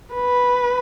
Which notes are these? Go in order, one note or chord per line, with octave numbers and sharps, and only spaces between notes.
B4